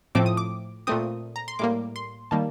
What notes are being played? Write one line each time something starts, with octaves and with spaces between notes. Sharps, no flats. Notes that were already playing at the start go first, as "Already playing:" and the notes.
A2 F3 A3 C4 D6
D#6
D6
A#2 A3 C4 D#6
A#5
C6
A2 G3 A#3 D6
C6
D#3 G3 A#3 A5